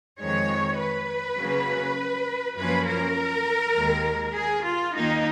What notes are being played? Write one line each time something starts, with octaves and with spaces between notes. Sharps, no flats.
F2 D#3 G#3 C#5
B4
C#3 F#3 A#3 C#4
F#2 F3 A#3 C#4 B4
A#4
D#2 D#3 G#3
G#4
F4
D#2 D#3 A#3 D#4